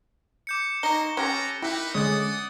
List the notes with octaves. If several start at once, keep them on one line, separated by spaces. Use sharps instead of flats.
D6 G6 C#7
A#3 D#4 D#5 C#6 G7
C#4 G4 A4 B4 A#5
D#4 E4 G4 A#4 B4
D3 G#3 C#4 D5 F#5 D#6